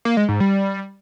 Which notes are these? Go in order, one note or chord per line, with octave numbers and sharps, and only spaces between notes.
A#3
G#3
G#2
G3